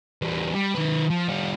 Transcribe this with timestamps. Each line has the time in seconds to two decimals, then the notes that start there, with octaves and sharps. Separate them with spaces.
0.22 E2 G3
0.54 G3
0.75 D#3 B4
1.10 F3
1.28 G3 F4